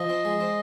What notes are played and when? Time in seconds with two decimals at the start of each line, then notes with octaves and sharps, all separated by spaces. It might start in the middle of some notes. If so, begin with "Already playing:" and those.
Already playing: F3 D#5
0.09 C4
0.25 G#3
0.41 C4